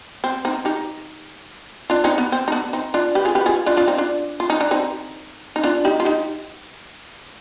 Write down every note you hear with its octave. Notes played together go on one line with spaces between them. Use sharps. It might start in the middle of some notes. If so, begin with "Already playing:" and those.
C4
C4 D#4
D#4 G4
D4 F4
C4 D#4
B3
C4
D#4
B3 D4
C4 D#4
D4 F4
G4 B4
F4 G#4
G4 B4
F4 G#4
D4 F4
D4 F4
C4 D#4
D4 F4
F4
D#4
D4
C4 D#4
D#4
D4 F4
D#4 G4
F4
D#4 G4